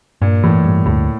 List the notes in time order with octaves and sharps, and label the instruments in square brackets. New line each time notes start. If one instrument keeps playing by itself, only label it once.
[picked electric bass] G2 [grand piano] A#2
[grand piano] A2 [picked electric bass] E3
[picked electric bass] G2
[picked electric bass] D2 [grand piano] A2